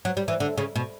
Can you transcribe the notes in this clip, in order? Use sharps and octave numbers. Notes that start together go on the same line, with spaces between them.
F#3
G3
E3
D3
C#3
B2